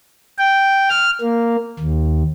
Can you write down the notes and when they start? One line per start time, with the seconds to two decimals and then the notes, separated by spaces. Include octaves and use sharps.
0.38 G5
0.90 F6
1.21 A#3
1.79 D#2